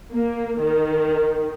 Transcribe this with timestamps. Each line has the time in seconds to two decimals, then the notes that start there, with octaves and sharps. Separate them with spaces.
0.12 A#3
0.61 D#3